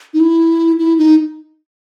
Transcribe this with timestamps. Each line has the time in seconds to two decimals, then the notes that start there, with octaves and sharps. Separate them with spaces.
0.14 D#4
0.20 E4
0.79 E4
0.98 D#4